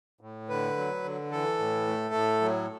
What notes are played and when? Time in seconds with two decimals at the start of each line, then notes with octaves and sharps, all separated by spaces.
0.21 A2
0.49 D3 B4
0.77 F#3
1.04 D3
1.31 E3 A4
1.59 A2
1.87 A3
2.15 A2
2.41 F#3